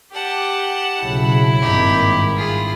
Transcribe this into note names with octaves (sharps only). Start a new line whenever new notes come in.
G4 F#5 A5
B1 C#3 F#3 E4
G#1 G2 A#2 D#4 G4
F4 G#4